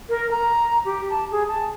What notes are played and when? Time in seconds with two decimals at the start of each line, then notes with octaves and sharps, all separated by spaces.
0.09 A#4
0.31 A#5
0.85 G4
1.10 A5
1.31 G#4
1.48 A5